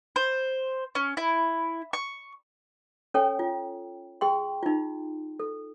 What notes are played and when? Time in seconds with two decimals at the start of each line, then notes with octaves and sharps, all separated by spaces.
0.16 C5
0.95 C#4
1.17 E4
1.93 C#6
3.14 C#4 A4 C#5 G5 G#5
3.39 F4
4.21 G#4 G5 C6
4.63 D#4 F4
5.40 A4